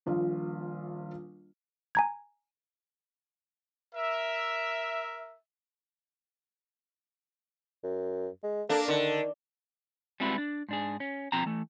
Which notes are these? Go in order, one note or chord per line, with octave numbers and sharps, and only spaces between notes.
D#1 A#1 F4
G#5 A#5 G#6
A#4 E5
F#2
G#3
A#3 D4 A4
D3 D#3
G3 G#3 B3 C4 E4 F#4
D4
G#2 D4 G#4
C#4
B2 F3 C4 G5 A#5
E3 A3